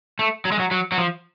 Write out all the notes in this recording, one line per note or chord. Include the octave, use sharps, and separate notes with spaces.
A3
F#3
G#3
F#3
F#3
F#3
F3